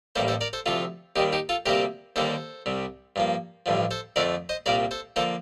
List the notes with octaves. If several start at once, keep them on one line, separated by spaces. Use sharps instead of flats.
A1 A2 G3 A#3 A4 C5
A4 C5
A#4 D5
A4 C5
D2 C3 F3 F4 A4
D#2 D#3 G3 D#4 G4
D#4 G4
F4 A4
D2 C3 G3 A#3 G4 A#4
D#2 D3 G3 A#3 A4 C5
C2 C3 G3
G2 F3 A#3
A1 G2 D3 F3
A4 C5
F2 D3 F3 A3 A#4 D5
C5 D#5
C2 A#2 G3 A#3 A#4 D5
A4 C5
D3 F3 A#3 A4 C5